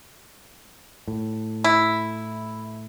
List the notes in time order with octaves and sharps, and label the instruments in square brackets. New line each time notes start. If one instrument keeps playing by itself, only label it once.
[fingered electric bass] A2
[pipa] E4